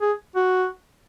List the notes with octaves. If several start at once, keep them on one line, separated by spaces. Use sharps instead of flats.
G#4
F#4